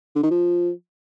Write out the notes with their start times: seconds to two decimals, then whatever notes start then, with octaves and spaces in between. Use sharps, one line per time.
0.15 D3
0.23 D#3
0.31 F3